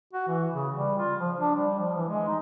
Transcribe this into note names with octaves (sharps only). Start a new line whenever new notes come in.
F#4
E3
C#3
G3
F4
F3
D4
G3
F3
E3
G#3
D#4